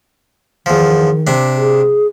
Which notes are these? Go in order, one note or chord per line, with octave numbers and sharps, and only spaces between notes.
E2 D#3 F3
C3 D4
G#4